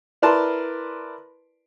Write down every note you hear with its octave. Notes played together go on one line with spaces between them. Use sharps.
E4 A#4 B4 D5 A5 C6